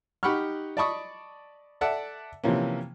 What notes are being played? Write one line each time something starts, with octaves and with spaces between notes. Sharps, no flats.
D#4 G4 F#5 B5 C#6 F6
D5 D#5 A5 B5 C#6 D#6
A4 D5 E5 F#5 A5
C3 E3 F3 A#3 C#4